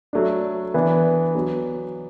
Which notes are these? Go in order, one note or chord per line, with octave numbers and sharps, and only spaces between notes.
F#3 A3 D4
E3 B3 D4
F#3 B3 D4